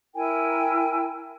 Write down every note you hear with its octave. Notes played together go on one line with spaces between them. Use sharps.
E4 A#4 G5 G#5